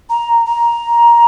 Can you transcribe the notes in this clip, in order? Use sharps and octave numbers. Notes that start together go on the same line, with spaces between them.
A#5
A#5